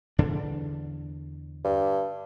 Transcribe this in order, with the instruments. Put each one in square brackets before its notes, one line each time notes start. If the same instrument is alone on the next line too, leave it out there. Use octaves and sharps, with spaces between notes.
[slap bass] E2 D3 D4
[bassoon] G2